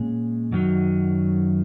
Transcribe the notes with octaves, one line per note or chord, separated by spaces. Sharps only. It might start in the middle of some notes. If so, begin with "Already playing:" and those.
Already playing: A#2 G#3 C#4 G#4
F#2 D#3 F#3